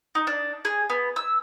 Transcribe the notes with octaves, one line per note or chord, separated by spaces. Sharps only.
D#4
D4
G#4
B3
E6